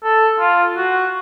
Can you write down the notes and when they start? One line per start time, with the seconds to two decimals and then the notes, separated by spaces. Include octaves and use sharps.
0.04 A4
0.40 F4
0.77 F#4